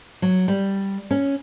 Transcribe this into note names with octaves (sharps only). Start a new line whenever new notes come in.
F#3
G3
C#4